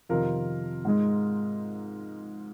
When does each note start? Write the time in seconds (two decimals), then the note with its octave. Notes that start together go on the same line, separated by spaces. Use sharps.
0.09 F2 C3 D#3 F4 A#4
0.85 G#2 G#3